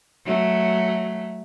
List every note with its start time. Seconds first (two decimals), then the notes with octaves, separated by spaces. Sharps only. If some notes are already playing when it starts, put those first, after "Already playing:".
0.25 F#3 A3